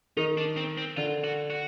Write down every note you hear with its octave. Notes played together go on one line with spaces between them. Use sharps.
D#3 D#4
D4
C4
C4
D3 F4
F#4
F#4